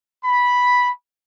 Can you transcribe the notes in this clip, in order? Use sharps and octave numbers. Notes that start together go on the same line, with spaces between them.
B5